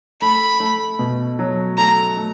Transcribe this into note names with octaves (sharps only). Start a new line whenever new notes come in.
A3 B5
A3
B2
F#3
A3 A#5
A3